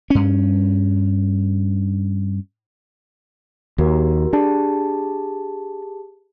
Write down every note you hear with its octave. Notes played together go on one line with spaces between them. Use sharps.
G2 C#4
D#2 F#4 G4 A#4
D4 G4 G#4 A5